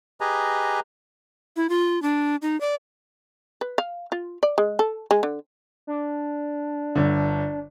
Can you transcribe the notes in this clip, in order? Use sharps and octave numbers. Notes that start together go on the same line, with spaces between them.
G4 G#4 B4 D#5 G#5 A#5
E4
F4
D4
D#4
D5
B4
F5
F4
D5
G#3
A4
G#3
D3
D4
G1 D3